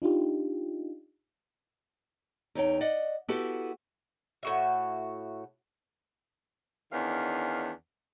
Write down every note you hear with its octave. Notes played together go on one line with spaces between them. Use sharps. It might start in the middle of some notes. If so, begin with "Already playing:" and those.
D4 D#4 F4 G4
E2 D#4 C#5 G5
D5 D#5 F#5
B3 E4 F#4 G4 A4 B4
A2 F#4 E5
E2 D#3 C#4 D4 F5